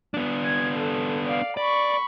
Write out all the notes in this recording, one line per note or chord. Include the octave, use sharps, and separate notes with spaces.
B3 D4
G#6
A4
D5 F5
D5 B5 C#6